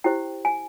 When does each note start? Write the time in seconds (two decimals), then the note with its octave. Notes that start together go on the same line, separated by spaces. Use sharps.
0.04 E4 G4 C5 G5
0.45 G#5